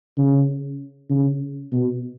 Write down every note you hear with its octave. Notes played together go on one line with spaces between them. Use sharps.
C#3
C#3
B2